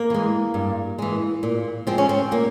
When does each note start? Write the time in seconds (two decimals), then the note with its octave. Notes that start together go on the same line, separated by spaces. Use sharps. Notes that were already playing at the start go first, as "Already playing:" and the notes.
Already playing: A#3
0.10 E3 G#3
0.54 G2
0.99 E3 G#3
1.43 A#2
1.87 F3 G#3 C4
1.98 C#4
2.09 C4
2.31 A#2 A#3